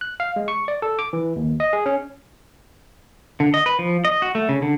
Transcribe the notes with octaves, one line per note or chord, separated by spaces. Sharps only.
F#6
F5
G#3
C#6
D5
A4
D6
E3
D#2
D#5
G#4
C#4
D3
D#5
B4
F3
D#5
F#4
A3
C#3
D3